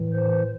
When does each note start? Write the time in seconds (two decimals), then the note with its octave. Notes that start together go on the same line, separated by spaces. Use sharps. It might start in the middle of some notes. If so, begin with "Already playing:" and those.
Already playing: A2 E3
0.13 C5